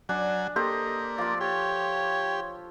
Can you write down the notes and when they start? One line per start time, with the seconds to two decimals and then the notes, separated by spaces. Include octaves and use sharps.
0.09 F#3 D4 G#5
0.56 A#3 G4 A4 C5 D#5
1.18 F3 F4 D5
1.41 G4 C#5